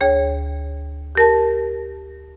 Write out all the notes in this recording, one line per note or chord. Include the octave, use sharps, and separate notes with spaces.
D2 G#4 C#5 G5
G4 A#4 A5